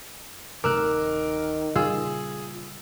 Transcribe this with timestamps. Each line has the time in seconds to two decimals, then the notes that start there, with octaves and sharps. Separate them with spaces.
0.64 D1 C3 D#3 A3 A#4 D6 E6 F#6
1.76 A#2 C#3 G3 F4 G#4 E6